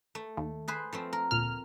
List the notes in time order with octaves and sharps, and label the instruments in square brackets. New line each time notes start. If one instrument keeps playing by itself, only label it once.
[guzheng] A3
[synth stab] D#2
[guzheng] G#4 B4 C5
F3 A3 C4
A#4
[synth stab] D2 A#2 F6